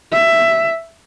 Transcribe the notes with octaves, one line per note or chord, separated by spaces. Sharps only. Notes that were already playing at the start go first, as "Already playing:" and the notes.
E5